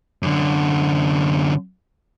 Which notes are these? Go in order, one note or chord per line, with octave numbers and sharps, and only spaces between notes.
F#2 D3